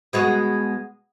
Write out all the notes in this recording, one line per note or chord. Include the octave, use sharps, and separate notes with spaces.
B2 G#3 F#4